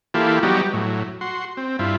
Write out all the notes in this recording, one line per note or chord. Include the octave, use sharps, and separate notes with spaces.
E3 A#3 E4 F4 G4 A4
F#3 G3 B3 D#4 F#4 G4
A2 F#3
F#4 C6
C4
G2 E4 F4